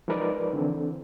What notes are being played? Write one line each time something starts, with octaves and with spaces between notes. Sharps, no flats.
F3 G#3 D#4 A#4 B4 D5
D3 E3 C4